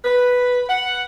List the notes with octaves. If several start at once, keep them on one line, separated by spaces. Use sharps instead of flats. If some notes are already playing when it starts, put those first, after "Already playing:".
B4
F#5